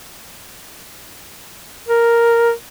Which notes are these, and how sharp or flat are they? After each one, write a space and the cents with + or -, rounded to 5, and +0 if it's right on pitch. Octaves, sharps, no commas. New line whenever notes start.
A#4 +0